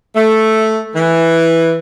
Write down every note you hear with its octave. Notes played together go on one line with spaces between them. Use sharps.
A3
E3